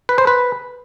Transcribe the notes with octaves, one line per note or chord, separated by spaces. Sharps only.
B4
C5
B4